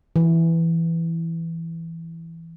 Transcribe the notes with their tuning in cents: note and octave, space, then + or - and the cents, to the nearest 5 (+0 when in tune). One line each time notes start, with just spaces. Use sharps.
E3 +5